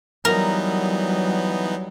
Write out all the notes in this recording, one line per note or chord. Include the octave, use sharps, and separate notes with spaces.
E3 F#3 G3 B3 D#4 A#4